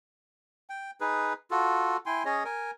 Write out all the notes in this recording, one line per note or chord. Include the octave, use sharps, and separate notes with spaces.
G5
D#4 G#4 B4
F4 F#4 A4
E4 G5 G#5 C6
C#4 G#4 C#5 D#5
A#4 G#5